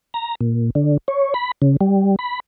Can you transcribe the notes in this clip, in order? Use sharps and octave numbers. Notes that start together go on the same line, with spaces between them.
A#5
A#2
D3
C#5
B5
C#3
G3
B5